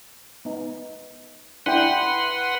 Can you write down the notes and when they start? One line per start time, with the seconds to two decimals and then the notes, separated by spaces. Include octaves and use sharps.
0.45 B3 D#4
1.66 D4 E4 B4 F#5 G5 C6